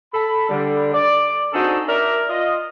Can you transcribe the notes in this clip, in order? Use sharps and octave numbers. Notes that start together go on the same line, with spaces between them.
A4 B5
D3 G3
D5
C4 D4 D#4 F#4 G#4 A4
A#4 D5 E5
F4 D#5